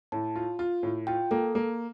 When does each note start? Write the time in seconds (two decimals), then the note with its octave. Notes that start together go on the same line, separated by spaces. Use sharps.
0.12 A2 A5
0.36 F4
0.59 F4
0.83 A2
1.07 F4 G5
1.31 A#3 A4
1.55 A#3